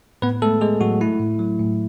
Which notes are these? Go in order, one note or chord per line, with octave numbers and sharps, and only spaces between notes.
A2 B3 B4
G#3 A3 A4
G#3 G#4
A2 F#3 F#4
A3 E4
A2
F#3
A2